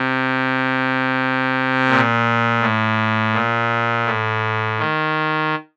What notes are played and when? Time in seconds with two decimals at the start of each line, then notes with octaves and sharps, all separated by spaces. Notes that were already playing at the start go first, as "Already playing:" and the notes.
Already playing: C3
1.89 A#2
2.61 A2
3.34 A#2
4.06 A2
4.79 D#3